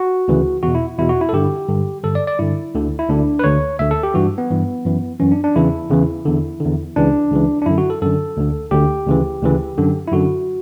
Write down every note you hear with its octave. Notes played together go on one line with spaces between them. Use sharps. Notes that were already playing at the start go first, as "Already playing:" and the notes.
Already playing: F#4
D2 C#3 E3
E2 B2 F#4
E4
E2 B2 E4
F#4
E4
A4
G2 D3 G4
G2 D3
G2 D3 A4
D5
D5
G2 D3 E4
D2 D3
E4
D2 D3 D4
B4
D2 D3 C#5
D2 D3 E5
A4
G4
G2 E3 F#4
B3
G2 E3
F#2 E3
F#2 E3 C#4
D4
D4
E2 C#3 E3 E4
E2 C#3 E3
E2 D3
E2 D3
C#2 C#3 E3 D4
C#2 C#3 E3
D4
F#2 D3 E4
F#4
A4
F#2 D3 A4
D2 D3
D2 D3 G4
D2 C#3 E3
D2 C#3 E3
F#2 D3
E4
F#2 D3 F#4